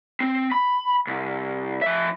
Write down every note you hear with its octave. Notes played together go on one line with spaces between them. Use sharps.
C4
B5
C2
F3 E5